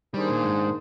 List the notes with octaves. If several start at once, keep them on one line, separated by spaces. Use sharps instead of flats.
D#3 G3 A#3 D4 G#4 C5
A#2
G#2